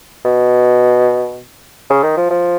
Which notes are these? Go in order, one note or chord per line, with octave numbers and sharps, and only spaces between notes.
B2
C#3
D#3
F3
F3